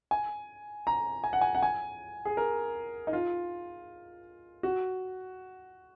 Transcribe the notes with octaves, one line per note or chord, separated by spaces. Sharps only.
G#5
A#5
G#5
F#5
G#5
F#5
G#5
G#4
A#4
D#4
F4
F#4